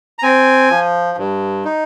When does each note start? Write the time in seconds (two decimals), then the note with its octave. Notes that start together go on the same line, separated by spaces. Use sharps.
0.19 A#5
0.23 C4 G#5
0.70 F3
1.18 G2
1.65 D#4